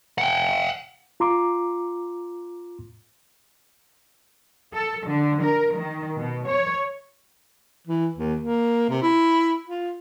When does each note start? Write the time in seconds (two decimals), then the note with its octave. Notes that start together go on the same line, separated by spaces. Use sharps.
0.18 F#5 G5
1.20 F4 A#5 C6 D6
4.74 A4
5.06 D3
5.42 A#4
5.77 D#3
6.18 B2
6.47 C#5
7.87 E3
8.16 D#2
8.41 A#3
8.89 C3
9.02 E4
9.67 F4